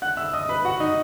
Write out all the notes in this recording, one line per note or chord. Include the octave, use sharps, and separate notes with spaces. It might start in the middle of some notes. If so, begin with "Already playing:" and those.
F#5 F#6
E5 E6
D#5 D#6
B4 B5
F#4 F#5
D#4 D#5